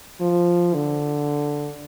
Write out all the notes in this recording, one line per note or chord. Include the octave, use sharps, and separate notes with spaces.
F3
D3